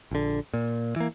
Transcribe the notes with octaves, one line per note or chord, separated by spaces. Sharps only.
A#1 D3
A#2
E3 A#3